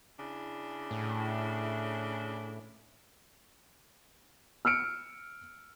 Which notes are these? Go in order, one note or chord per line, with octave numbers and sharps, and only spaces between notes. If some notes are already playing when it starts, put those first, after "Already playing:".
C#3 D4 E4
A2
E6 F6 C#7 D7